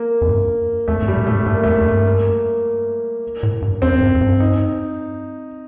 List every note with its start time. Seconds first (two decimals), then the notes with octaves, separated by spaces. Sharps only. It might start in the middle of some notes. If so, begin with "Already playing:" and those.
Already playing: A#3
0.22 F2
0.29 G2
0.88 F2 A3
1.02 G2
1.08 G3
1.17 A#2
1.27 A3
1.32 A2
1.46 G2 A3
1.54 A#3
1.64 F2 A3
1.81 F2
1.86 G2
2.05 A#3
3.43 A2
3.62 G2
3.82 F2 C4
3.92 F2
4.01 G2
4.15 F2
4.21 G2
4.40 D#4